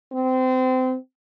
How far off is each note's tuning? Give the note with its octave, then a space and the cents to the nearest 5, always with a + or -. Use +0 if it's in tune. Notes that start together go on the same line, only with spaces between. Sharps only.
C4 -25